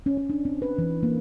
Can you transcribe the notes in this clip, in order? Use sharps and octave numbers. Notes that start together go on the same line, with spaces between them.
C#4
C#4
D4
C4
B4
E3
A#3